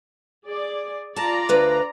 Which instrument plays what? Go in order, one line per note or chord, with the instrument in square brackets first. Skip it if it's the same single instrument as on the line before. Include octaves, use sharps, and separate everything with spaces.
[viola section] G#4 D5
[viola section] F4 D5 A#5 [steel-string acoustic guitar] A5
[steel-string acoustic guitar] D2 B4 F5